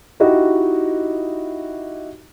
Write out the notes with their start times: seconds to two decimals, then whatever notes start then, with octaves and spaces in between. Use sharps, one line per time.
0.20 D#4 E4 F#4 G4 D#5